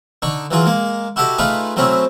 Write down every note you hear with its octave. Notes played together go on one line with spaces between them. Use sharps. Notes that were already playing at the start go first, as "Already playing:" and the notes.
D3 D#4 C#6
E3 F#3 F4 G#4
G#3 A#3
E4 F#4 G4 A4 D#5
A3 D#4 F4 G#4 B4
F#3 A3 C4 C#4 E4